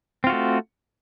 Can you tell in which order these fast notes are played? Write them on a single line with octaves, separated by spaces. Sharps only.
C4 F4 F#4 A3